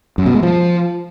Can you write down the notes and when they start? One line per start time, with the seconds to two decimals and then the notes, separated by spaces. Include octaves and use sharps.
0.18 F#2
0.26 B2
0.35 G#3
0.43 F3